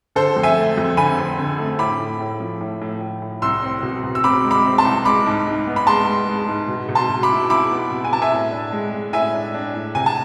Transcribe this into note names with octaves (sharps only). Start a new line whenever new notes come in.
D3 A4 C5
F2
E5 G#5
A3
F2
D3 G#5 B5
C4
D3
A3
A2 B5 D6
A2
A2
F3
A2
A2
A2
A2
C2 C6 E6
C4
B2
B2
E6
C4 B5 D6
G#3
B5 D6
C4
A5 C6
C2
G#3 B5 D6
G#2
G#2
B3
B5
G#3 A5 C6
G#3
G#3
G#2
B2
B2
A5 C6
B2
B5 D6
E4
E4 B5 D6
B3
B2
G#5
B2 A5
E5 G#5
A2
D4
G#3
G#3
A2 E5 G#5
D4
D4
A2
C3 G#5
A5